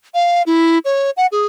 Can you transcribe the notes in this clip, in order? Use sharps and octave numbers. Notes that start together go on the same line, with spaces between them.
F5
E4
C#5
F#5
G#4